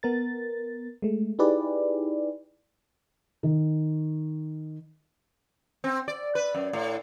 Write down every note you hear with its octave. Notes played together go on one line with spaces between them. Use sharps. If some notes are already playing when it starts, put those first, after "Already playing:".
B3 A#4 A6
G#3 A3
D#4 E4 G4 G#4 B4 D5
D#3
C4
D5
B4
F#2
A2